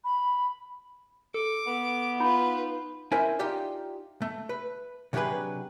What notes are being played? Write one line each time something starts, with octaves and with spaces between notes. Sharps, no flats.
B5
A4 D6
B3
D#4 F4 B4 B5
C#4 E4 A#4 C5 E5 G#5
D#4 F4 G4 D5
A3
B4
C3 F#3 D4 G4 G#4 B4